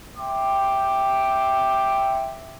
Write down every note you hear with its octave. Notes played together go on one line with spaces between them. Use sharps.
E5 G5 C6 D6